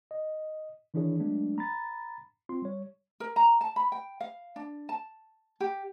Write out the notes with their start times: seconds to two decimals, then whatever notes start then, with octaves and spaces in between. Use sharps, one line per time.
0.11 D#5
0.94 D#3 E3 D4 E4 G#4 C#5
1.20 F#3 G#3 A3 B3 D4
1.58 A#5 B5 A6
2.49 C4 F4 C6
2.62 G3 C#5
3.20 A#4
3.36 A#5
3.61 A5
3.76 B5
3.92 G5
4.21 F5
4.56 D4
4.89 A5
5.60 G4